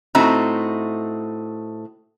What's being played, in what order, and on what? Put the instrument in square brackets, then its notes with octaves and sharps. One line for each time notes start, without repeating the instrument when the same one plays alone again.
[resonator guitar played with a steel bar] A2 A3 C4 D#4 F#4 A#5